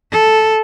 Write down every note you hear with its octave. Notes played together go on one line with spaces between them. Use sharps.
A4